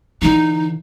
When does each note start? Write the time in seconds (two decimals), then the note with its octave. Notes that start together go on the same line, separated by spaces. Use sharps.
0.22 D3 E3 D#4